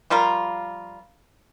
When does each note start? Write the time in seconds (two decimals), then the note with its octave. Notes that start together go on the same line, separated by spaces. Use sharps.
0.10 F3 G3 F4 A#4